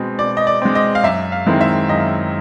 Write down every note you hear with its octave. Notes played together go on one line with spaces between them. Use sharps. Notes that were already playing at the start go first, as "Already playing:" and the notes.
Already playing: B2 G#3 C4
B2 D5
D#5
D5
G#3 C4
D#5
F5
F#2 E5
F5
D#3 G#3 C4 E4
E5
F#2 D#5